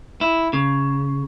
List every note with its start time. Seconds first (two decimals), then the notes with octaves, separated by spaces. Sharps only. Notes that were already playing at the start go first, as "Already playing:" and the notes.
0.21 E4
0.53 C#3